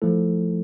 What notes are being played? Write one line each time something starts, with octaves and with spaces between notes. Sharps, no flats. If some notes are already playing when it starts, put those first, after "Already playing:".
F3 A3 E4 A4